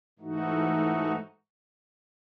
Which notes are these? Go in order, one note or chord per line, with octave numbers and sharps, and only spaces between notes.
G#2 E3 A3 D#4 F#4